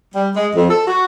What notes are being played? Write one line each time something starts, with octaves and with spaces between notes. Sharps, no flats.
G3
G#3
F2
A4
F#4